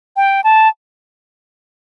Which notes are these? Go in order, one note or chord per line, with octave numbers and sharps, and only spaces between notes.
G5
A5